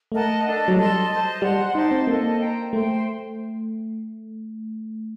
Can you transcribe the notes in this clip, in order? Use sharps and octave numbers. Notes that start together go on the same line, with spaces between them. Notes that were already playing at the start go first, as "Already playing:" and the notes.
A3 A#4 D#5 F#5 A5
D4 A4 D#5
F#3
G3 A4 D#5 A5 C6
C5 D#5 A5
G3 C5 F#5 C6
D#4 G4 C5 D#5 A5
C4
A#3 D4 A4 D#5
C5 G5 A#5
A3 C5 G5 C6